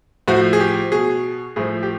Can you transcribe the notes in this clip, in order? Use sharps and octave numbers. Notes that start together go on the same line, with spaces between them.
A2 F3 F#4
G#4
G4
B2 G#4
A2 F3 G#4
G4